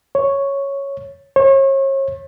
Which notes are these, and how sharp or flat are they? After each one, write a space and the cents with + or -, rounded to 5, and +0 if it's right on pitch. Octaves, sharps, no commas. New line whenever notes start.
C#5 +0
C#5 -35